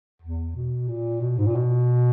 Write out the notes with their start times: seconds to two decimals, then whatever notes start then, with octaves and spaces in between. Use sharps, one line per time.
0.22 E2
0.55 B2
0.88 A#2
1.21 B2
1.38 G#2
1.47 A#2
1.55 B2